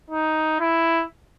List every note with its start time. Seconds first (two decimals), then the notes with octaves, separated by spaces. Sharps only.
0.10 D#4
0.60 E4